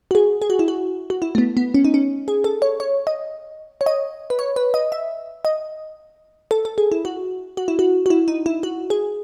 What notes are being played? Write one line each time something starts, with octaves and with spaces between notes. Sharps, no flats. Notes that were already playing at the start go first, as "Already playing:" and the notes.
F#4
G#4
G#4
F#4
E4
F#4
F#4
E4
A3
B3
B3
C#4
D#4
C#4
G#4
A4
C#5
C#5
D#5
C#5
D#5
B4
C#5
B4
D#5
E5
D#5
A4
A4
G#4
E4
F#4
F#4
E4
F#4
F#4
E4
D#4
E4
F#4
G#4